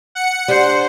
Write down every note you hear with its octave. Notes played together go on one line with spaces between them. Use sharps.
F#5 C#7
D4 G4 C5 C7